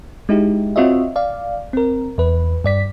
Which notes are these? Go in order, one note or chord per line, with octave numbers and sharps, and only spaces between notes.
G#3 D#4 E4 G4
C4 F4 F#4 C#5 D#5 E5
D5 F5
C4 A#4
E2 B4
G2 D5 B6